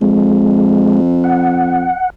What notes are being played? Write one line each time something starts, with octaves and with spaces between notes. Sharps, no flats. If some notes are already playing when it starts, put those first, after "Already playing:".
F2 G#3
F#5